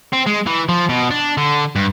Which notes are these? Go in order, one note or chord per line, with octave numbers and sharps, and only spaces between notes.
C4
G#3
E3
F3
B2
D4
D3
G2